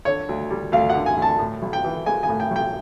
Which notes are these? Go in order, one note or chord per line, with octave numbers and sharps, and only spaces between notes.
D3 C#5
D2
G3
D2 F5
F#5
D3
G#5
D2
A5
A2
B1
G5
E3
G#3 G#5
G#5
A2
G5
B1
G5